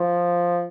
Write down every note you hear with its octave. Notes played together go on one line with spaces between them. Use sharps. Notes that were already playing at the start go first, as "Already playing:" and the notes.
Already playing: F3